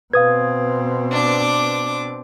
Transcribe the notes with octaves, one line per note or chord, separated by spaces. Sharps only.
B2 C4 B4 F5 D#6 G#6
D4 D6